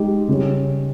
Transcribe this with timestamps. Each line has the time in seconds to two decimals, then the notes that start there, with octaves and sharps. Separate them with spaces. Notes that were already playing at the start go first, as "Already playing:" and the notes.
Already playing: G#3 D#4 G4
0.28 C#3 G3 C#4